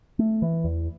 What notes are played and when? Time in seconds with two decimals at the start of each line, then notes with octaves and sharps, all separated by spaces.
0.19 A3
0.42 E3
0.64 E2